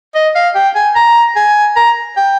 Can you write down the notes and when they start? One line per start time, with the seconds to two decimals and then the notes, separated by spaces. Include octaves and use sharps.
0.15 D#5
0.35 F5
0.55 G5
0.75 G#5
0.95 A#5
1.36 G#5
1.76 A#5
2.16 G5